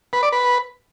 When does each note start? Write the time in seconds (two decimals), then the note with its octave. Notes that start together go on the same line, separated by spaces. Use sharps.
0.13 B4
0.23 D5
0.32 B4